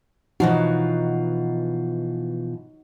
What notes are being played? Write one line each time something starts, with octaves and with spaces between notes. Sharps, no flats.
B2 E3 F3 D#4 F#4